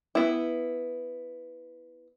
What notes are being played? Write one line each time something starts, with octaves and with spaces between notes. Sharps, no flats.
B3 E4